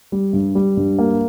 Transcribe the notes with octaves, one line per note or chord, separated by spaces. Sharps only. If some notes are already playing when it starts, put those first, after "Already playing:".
G3
G2
G3
G2
A#3